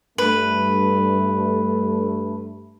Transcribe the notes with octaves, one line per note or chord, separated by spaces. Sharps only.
G2 A3 B4